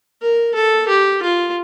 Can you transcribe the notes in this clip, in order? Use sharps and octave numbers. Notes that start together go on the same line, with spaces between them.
A#4
A4
G4
F4